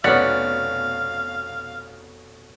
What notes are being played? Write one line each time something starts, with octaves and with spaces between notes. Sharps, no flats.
F1 B2 B3 C#4 D5 F5 F#5 A6